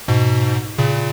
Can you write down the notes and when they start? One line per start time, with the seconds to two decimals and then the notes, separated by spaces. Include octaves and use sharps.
0.08 G#2 B2
0.78 A#2 C#3